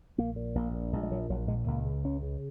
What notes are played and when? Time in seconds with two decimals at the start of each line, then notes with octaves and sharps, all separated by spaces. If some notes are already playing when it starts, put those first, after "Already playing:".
0.18 A#1 A#3
0.36 A#2
0.55 A#1 A#3
0.74 A#2
0.93 A#1 G#3
1.03 G#3
1.11 A#2 F#3
1.29 A#1 F#3
1.48 A#2 G#3
1.67 C#2 A#3
1.85 C#3
2.04 C#2 C#4
2.22 C#3